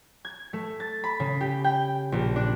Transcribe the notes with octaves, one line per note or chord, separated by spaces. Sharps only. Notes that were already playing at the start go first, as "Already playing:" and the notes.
G#6
A3
A6
B5
C#3
G4
G5
A#1
D4